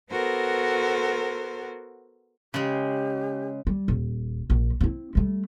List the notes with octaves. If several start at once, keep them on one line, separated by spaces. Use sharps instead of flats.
B3 F#4 A4 A#4 C5
C#3 G#3 G4
G3
D#1
A#1
C4 E4
G3 A3